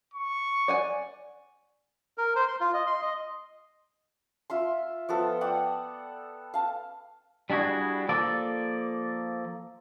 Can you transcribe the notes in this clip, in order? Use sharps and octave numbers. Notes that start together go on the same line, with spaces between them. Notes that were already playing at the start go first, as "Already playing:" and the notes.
C#6
D5 F#5 G#5
A#4
C5
C6
F4
D#5
C6
D#5
F4 E5 C6
F3 B3 A4
D5 F#5 G5 D#6
F5 A5
G3 D4 E4 F#4 G#4
F3 A#3 A4 D5